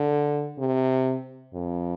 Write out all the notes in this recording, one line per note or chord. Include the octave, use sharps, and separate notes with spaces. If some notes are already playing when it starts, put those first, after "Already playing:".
Already playing: D3
C3
F2